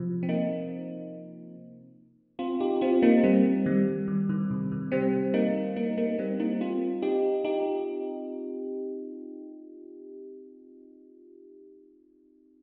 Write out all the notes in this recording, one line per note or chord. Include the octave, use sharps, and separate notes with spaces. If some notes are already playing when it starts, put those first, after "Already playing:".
Already playing: C3 F3
C4
A#3 D#4
C4 F4
D#4 G4
C4 F4
A#3 D#4
G3 C4
D#3 G3
D#3
D#3
C3
D#3
G3 C4
A#3 D#4
A#3 D#4
A#3 D#4
G3 C4
A#3 D#4
C4 F4
D#4 G4
D#4 G4